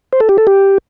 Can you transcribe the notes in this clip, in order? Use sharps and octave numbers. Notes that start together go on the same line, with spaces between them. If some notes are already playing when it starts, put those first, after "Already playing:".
C5
A4
G4
A4
G4